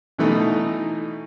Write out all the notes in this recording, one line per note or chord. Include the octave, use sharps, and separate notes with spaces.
B2 E3 A3 D#4